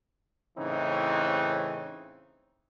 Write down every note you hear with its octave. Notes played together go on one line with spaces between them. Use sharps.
A2 C#3 E3 C4 D#4